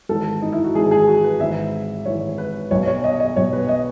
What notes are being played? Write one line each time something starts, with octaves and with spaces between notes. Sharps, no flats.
G#1 G#2 E3 A4
D#4
E4
F#4
G#1 G#2 E3 G#4
G#4
F#4
B4
G#1 G#2 E3 E5
G#1 G#2 E3 C#5
B4
B1 B2 C#5
C#5
D#5
D#5
B1 B2 C#5
B4
D#5